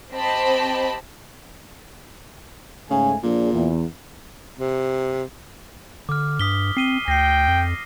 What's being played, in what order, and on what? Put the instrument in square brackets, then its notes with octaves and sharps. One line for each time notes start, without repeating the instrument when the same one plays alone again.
[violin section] C4 G4 C5 D#5 A5 B5
[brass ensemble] G#2 A3 G#5 [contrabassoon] C#3
[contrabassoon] A#2 [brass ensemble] F3 D4 G#4
[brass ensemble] E2
[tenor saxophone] C3
[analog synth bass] D3 [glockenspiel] D6 F6
[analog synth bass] G2 [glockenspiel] D#6 B6 G7
[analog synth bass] C4 [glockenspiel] C7 D#7 G7
[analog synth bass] D2 [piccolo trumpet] G5 [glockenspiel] A#6 C7
[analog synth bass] F2